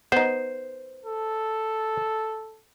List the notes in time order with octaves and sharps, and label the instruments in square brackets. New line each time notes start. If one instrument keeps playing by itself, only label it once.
[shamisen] B3 D#4 [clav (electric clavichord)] C5
[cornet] A4